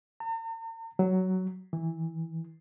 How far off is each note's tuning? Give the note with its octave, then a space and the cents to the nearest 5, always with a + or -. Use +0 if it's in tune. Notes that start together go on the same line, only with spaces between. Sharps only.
A#5 -45
F#3 +10
E3 -15